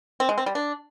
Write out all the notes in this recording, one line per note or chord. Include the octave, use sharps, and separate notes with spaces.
C4
G#3
C4
G3
D4